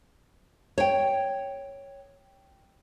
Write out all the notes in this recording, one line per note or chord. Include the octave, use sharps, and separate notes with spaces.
C#5 G5